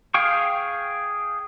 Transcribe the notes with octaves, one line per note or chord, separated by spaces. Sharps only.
G#4 F5 G5 C#6